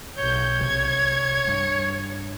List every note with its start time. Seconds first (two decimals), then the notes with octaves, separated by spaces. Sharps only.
0.18 B1 C#5 G6
0.61 C2 G#6
1.47 G2